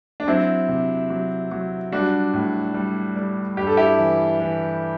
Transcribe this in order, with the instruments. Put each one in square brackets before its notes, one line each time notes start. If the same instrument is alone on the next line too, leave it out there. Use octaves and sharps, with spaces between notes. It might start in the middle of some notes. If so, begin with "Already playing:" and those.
[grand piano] D4
F#3 C4 E4
C3
F#3
F#3
G3 D4 F#4
A2
G3
G3
G2 G4
A4
E4 G4
E3
E3